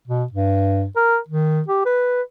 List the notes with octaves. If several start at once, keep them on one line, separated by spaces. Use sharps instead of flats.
B2
G2
A#4
D#3
G4
B4